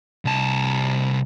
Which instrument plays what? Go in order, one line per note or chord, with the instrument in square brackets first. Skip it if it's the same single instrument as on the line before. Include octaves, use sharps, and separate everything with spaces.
[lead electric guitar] C2 A5